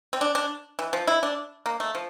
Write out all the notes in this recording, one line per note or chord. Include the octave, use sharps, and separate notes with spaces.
C4
D4
D4
E3
F3
E4
D4
A#3
A3
F3